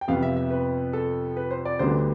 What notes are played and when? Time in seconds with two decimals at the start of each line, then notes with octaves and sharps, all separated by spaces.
0.01 G5
0.08 F2 C3 F3 B3 F5
0.23 E5
0.37 E5
0.50 B4
0.93 A4
1.37 B4
1.51 C5
1.65 D5
1.79 D2 D3 G3 B3 D4 C5